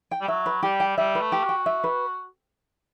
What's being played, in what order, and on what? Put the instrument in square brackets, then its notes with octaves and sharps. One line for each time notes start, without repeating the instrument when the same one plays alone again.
[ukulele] G5
[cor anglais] G3
[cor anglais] F#3 [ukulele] E5
[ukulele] B4
[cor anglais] G3 [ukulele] G4
[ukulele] G5
[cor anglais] G3 [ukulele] E5
[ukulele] B4
[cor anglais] A3
[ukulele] G4
[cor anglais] F#4
[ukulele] G5
E5
B4